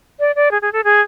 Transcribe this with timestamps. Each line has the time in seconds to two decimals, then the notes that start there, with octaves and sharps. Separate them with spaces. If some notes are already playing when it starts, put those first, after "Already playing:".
0.20 D5
0.36 D5
0.51 G#4
0.62 G#4
0.73 A4
0.84 G#4